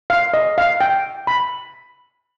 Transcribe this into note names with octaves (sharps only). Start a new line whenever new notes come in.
F5
D#5
F5
G5
B5